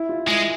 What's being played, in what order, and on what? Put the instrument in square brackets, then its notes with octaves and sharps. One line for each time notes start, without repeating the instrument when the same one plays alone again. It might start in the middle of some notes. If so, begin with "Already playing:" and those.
Already playing: [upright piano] E4
F4
[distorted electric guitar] G#3 [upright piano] E4